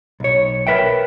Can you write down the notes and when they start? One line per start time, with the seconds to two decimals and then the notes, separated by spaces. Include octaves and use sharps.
0.20 B1 C#5
0.67 A#4 B4 E5 G5